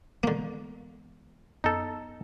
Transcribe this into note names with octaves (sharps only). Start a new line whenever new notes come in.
D3 E3 G#3 A#3 B3
F#2 B3 D#4 A4